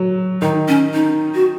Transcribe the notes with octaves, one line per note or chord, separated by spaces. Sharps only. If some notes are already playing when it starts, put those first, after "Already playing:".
Already playing: F#3
D#3 D#4
C#4
D#4
F#4